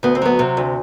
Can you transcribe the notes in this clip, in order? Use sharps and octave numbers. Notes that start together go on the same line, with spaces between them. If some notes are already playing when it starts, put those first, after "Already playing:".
D2 B3
C4
F#3 B3
C3
D2